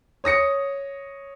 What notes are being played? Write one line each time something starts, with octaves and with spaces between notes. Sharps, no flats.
C#5 D#6 A#6 C#7